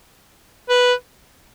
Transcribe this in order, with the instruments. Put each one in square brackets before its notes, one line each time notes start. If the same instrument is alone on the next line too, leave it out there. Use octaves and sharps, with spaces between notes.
[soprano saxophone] B4